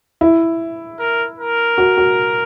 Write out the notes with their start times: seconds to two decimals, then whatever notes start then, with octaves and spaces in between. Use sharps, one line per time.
0.21 E4
0.99 A#4
1.38 A#4
1.78 F#4
1.97 F#4